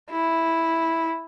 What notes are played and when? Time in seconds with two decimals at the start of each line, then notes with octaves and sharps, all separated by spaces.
0.10 E4